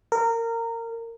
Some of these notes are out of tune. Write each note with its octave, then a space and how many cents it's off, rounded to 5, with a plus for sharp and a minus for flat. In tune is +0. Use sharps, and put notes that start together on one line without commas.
A#4 -20